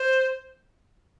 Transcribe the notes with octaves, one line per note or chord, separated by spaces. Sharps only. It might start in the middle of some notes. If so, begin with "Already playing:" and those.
Already playing: C5